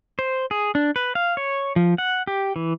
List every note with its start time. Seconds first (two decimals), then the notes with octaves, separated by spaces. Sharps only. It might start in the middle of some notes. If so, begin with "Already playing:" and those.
0.19 C5
0.51 G#4
0.75 D4
0.96 B4
1.15 F5
1.37 C#5
1.76 F3
1.98 F#5
2.27 G4
2.56 E3